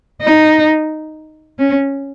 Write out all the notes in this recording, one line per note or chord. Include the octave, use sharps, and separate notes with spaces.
D#4
C#4